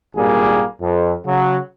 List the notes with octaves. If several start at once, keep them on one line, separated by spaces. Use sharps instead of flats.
G#1 G2 A#2 G3 A#3 G#4
F2
C#3 F#3